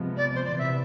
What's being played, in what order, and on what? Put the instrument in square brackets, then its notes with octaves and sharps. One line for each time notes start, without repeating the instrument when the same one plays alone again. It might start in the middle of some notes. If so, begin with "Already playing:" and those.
Already playing: [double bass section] C3 F3 G#3 B3
[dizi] D5
C5
[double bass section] C3 E3 B3 [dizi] D5
[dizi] E5